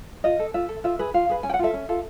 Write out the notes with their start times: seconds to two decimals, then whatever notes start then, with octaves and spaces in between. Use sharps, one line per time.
0.24 F4 D#5
0.39 A4
0.54 F4 E5
0.69 A4
0.84 F4 E5
0.99 G#4 B4
1.14 F4 F5
1.29 G#4 B4
1.43 C#4 G#5
1.50 G5
1.54 F#5
1.59 F4 A4 E5
1.74 C#4
1.89 F4 A4